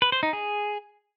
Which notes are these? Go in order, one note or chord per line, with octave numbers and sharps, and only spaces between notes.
B4
C5
D#4
G#4